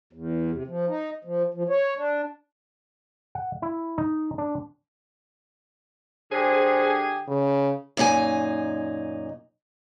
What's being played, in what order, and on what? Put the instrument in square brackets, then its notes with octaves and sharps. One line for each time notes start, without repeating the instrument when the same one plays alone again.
[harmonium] E2
C3
F3
D#4
F3
F3
C#5
D4
[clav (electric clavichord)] F#5
E4
D#4
D4
[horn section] D3 G4 G#4 [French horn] C5
[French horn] C#3
[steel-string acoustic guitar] F#2 A#2 D#4 G4 G#5